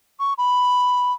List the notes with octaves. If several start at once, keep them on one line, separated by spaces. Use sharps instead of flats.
C#6
B5